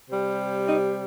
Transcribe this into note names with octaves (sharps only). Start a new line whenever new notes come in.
C3 G3
C4 D#4